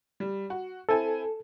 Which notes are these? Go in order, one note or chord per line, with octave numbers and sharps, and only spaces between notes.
G3
F#4
C4 E4 A4 G#5